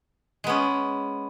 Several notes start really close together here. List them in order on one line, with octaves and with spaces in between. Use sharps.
G#3 B3 C#4